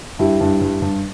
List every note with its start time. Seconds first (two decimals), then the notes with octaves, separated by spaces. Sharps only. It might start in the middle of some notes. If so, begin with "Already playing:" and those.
0.19 G2 E4 G4
0.41 G2
0.61 G2
0.82 G2